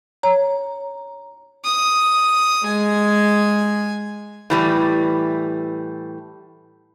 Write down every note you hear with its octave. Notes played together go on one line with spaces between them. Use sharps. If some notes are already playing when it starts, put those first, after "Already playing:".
C#5 A#5
D#6
G#3 G#5
A2 E3 G3